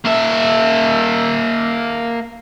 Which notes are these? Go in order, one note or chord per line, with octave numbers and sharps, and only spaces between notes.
A#3 E5